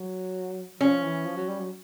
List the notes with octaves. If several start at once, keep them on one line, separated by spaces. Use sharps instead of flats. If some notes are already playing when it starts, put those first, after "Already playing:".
Already playing: F#3
F3 C#4
E3
F3
F#3
G3
F#3